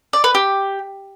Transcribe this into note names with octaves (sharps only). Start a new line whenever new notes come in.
D5
B4
G4